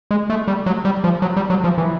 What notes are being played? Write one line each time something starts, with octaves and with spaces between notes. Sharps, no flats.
G#3
A3
G3
F#3
G3
F3
F#3
G3
F#3
F3
E3